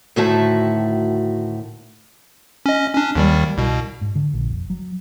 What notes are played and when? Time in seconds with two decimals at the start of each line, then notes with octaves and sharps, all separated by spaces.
0.16 D2 A2 D#3 F#4 E5 A5
2.66 C#4 D#5
2.95 C#4 D4
3.15 D#2 D#3 G3
3.57 C2 B2
4.01 G#2
4.16 D3
4.33 A#1
4.49 F1
4.70 F#3